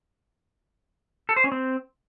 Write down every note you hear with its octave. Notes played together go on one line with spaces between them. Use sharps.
A4
C5
C#4
C4